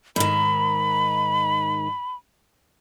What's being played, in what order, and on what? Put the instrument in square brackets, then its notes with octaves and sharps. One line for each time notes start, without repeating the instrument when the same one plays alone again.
[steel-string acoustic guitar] G#2 D#3 [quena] B5